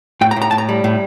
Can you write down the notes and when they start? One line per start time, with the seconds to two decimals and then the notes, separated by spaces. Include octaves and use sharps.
0.21 A2 G5
0.31 A#5
0.36 A2
0.42 A#5
0.51 A2 A5
0.58 A#5
0.69 G3
0.84 A2